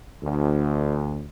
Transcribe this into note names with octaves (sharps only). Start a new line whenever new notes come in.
D2